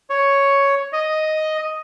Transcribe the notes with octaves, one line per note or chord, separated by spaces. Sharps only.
C#5
D#5